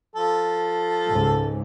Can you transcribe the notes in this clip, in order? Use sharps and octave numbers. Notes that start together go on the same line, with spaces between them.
F3 A4
C#2 G#2